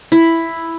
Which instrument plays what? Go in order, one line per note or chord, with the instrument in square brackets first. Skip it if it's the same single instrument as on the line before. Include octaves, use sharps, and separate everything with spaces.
[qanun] E4